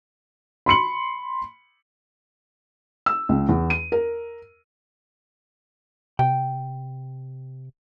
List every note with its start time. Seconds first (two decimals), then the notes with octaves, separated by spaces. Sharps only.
0.66 B5 C6 C#7 F#7
3.06 E6
3.29 C#2
3.49 E2
3.70 D#7
3.92 A#4
6.19 C3 G5